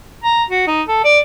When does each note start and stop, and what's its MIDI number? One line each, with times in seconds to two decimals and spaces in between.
0.24 0.43 82
0.50 0.63 66
0.67 0.82 63
0.88 1.03 69
1.04 1.19 74